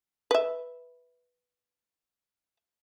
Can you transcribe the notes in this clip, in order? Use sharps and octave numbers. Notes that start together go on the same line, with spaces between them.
B4 E5